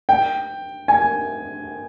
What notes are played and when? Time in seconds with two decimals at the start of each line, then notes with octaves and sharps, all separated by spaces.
0.09 G5
0.88 G#5